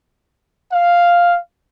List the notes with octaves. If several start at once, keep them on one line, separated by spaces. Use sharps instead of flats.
F5